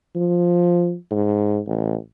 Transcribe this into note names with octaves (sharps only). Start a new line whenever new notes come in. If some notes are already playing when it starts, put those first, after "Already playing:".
F3
G#2
A1